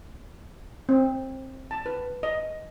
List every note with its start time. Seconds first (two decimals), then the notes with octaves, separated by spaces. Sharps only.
0.89 C4
1.71 A5
1.86 B4
2.23 D#5